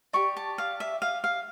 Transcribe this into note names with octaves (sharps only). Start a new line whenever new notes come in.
G4 D5 C#6
A5
F5
E5
F5
F5